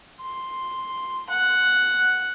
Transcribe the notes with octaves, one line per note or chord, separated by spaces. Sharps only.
C6
F#5